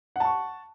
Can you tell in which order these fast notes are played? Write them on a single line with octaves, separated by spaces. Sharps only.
F#5 A5 C#6